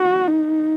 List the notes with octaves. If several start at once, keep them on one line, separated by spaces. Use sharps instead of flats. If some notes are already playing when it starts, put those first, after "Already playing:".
Already playing: F#4
D#4